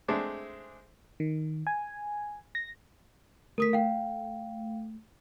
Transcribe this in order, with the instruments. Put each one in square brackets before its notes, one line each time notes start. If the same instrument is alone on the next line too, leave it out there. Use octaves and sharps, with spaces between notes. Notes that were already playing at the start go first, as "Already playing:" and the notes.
[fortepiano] G#3 A3 C4 D4 E5
[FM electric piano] D#3
G#5
A#6
[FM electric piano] A3 [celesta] A#4 D#6 B6
[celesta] F5 G5